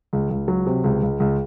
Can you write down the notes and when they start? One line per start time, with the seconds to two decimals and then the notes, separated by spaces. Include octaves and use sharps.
0.13 C#2
0.30 C#2
0.48 F#3
0.66 C3
0.84 C#2
1.02 C#2
1.20 C#2